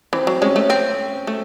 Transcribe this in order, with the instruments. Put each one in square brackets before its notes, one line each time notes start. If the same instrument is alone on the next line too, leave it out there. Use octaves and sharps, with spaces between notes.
[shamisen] E3 [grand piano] C4
[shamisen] F#3
[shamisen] G#3 [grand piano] C#4
[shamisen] A3
C4
A3